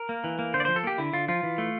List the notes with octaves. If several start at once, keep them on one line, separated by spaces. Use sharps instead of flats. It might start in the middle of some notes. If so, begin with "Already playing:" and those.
Already playing: A#4
A#3
E3
A#3
D3 C5
D5
F3 C5
A4
A#3 G4
D3 E4
D3 F4
F3 F4
E3
A3